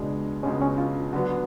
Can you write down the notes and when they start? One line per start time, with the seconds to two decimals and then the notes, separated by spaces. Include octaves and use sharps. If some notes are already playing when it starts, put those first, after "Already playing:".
Already playing: C#2 B2 G#3 D4
0.43 C#2 B2 G#3 C#4
0.62 C#4
0.78 F4
1.13 D3 F#3 B3 F#4